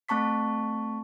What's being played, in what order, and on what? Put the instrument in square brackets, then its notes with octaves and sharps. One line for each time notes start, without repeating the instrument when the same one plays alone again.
[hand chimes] A3 C4 A5 C#6 B6